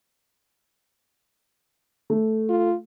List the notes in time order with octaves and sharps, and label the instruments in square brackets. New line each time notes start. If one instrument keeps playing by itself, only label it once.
[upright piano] A3
[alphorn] F4